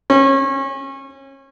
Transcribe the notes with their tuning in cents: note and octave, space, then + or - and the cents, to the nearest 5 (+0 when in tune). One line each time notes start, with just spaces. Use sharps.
C#4 -30